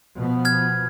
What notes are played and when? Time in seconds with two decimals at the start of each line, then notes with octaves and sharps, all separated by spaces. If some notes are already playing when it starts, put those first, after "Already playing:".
0.16 B2 F3 B3
0.45 F6 G#6